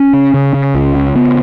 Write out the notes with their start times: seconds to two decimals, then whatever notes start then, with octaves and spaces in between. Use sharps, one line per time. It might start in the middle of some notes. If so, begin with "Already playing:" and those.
Already playing: C#4
0.13 C#3
0.34 C#3
0.54 C#3
0.74 C#2
0.95 C#3
1.15 C#3 B3